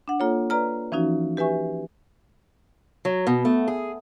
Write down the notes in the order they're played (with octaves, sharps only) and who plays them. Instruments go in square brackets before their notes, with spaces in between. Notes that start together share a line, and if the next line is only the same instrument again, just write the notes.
[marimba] D4 F#5
A#3 F4 A4 C#5
B4 D5 A#5 F6
E3 F3 C#4 D#4 F#4
G4 B4 E5 G#5 C#6
[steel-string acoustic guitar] F#3
B2
A3
G#4